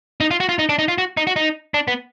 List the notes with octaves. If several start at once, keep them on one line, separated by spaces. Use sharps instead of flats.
D#4
F4
F#4
F4
D#4
D4
D#4
F4
F#4
D#4
F#4
D#4
D4
B3